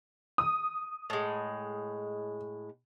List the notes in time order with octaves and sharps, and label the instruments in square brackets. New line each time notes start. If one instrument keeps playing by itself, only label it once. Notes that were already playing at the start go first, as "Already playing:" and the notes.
[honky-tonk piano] D#6
[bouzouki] A2 G#3